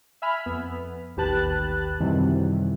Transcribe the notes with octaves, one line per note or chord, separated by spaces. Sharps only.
E5 G#5 B5 F6
F2 B3
A1 D#2 G4 B4 A5 F#6
F#2 C3 D#3 E3 F#3 G3